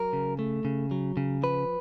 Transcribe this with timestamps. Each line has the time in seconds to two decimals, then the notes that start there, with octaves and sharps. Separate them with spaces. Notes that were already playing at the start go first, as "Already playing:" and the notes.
Already playing: F#3 A#4
0.13 C#3
0.39 A3
0.65 C#3
0.91 F#3
1.17 C#3
1.43 F3 B4